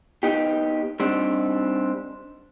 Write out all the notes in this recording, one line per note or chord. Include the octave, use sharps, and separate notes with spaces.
B3 D#4 G4
G3 C4 D4 D#4